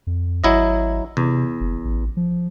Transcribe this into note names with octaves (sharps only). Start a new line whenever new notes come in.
F2
G#1 F#3 E4 D#5
E2 C3
F#1
A1
F3